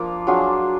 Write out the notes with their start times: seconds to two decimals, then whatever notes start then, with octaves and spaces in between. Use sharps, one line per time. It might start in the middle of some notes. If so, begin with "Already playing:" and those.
Already playing: F3 A#3 D4 F4
0.27 F#3 D4 F4 G#4